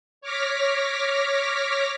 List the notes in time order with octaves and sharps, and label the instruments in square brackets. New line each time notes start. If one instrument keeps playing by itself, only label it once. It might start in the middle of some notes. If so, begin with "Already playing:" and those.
[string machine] C#5 D6 F6 A#6 B6